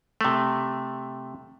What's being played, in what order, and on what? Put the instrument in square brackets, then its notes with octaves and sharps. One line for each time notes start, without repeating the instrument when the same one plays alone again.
[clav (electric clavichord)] C3 A3